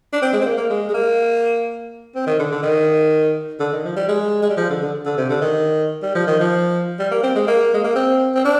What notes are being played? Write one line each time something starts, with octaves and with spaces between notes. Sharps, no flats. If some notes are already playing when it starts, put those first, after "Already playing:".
D4
C4
G#3
C4
A#3
A#3
G#3
G#3
A#3
C4
D#3
D3
D3
D#3
D3
D#3
F3
G3
G#3
G#3
G3
F3
D3
D3
D3
C3
D3
D#3
G3
F3
D#3
F3
G3
A#3
C4
G#3
A#3
G#3
A#3
C4
C4
D4